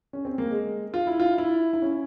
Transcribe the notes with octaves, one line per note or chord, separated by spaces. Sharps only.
C#4
C4
A#3
G#3
F4
E4
F4
E4
E4
C#4